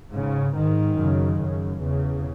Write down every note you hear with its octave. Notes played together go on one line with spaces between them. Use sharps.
G#2 C#3
G#2 D#3
F#2 C#3
F#2 C#3
E2 C#3